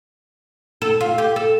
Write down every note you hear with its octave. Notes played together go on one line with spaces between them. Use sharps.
A4
F4
G4
A4